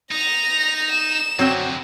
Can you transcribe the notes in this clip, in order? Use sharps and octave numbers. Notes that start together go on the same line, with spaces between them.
D#4 A#6 F7
E7
F#2 D3 F#3 C4 G5